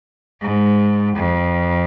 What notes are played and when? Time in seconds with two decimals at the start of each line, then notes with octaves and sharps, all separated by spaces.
0.42 G#2
1.16 F2